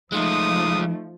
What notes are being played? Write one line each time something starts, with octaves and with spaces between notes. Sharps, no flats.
F3 G#3 A3 D#4 F4 D#6